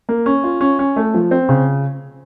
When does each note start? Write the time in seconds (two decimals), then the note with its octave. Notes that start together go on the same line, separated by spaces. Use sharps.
0.09 A#3
0.26 C#4
0.44 F4
0.61 C#4
0.79 C#4
0.96 A3
1.14 F3
1.31 C4
1.49 C#3